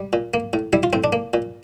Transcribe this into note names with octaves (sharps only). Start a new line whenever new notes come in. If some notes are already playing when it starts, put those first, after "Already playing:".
Already playing: G3
A#2
A#3
A2
G3 E4
F4
A2 C4
D4
A#3
A#2